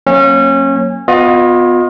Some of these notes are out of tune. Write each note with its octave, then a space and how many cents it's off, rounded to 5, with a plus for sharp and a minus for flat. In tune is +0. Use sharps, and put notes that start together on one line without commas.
F#3 +0 A#3 +0 C#4 -25
B3 +20 F4 +35 D#5 +0